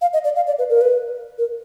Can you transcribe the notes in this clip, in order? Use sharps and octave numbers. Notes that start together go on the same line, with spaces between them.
F5
D#5
D5
F5
D5
B4
A#4
B4
A#4